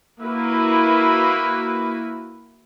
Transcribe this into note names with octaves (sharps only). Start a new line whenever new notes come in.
A#3 E4 F#4 B4